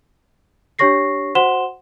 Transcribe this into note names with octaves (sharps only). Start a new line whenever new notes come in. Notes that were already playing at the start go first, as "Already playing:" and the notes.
D4 G4 C#5 C#6 A#6 C7
F#4 C5 F#5 C6 E7 G7